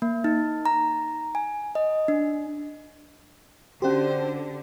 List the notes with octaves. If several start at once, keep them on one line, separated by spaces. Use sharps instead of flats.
A#3
D#4
A#5
G#5
D#5
D4
D3 C#4 F#4 G4 C5